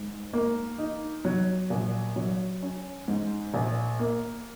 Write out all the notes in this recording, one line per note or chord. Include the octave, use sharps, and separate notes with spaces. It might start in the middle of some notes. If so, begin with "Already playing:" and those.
Already playing: G#2
A#3
D#4
F#3
A#1
F#3
C#4
G#2
A#1
A#3